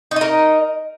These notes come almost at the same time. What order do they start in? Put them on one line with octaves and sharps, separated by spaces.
D#4 D#5 A#4